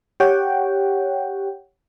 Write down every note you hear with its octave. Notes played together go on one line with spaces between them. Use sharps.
G4 C#5 F#5 G5